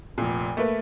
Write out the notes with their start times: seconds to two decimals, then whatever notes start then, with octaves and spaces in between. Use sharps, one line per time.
0.18 F1 A#2
0.57 A3 A#3 B4